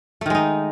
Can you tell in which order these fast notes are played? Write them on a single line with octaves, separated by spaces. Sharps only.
A3 D#3 G#3 D#4